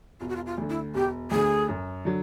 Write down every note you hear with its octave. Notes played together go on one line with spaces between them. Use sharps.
E1 F4
F#4
F4
F4
D2 D3
E4
E1 G4
D2 D3 G#4
F#2
D3 F#3